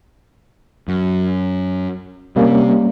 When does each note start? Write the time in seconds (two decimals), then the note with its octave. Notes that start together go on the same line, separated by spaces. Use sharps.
0.88 F#2
2.36 C3 G3 A#3 C#4